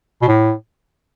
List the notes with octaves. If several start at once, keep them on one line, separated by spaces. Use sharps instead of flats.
B2
A2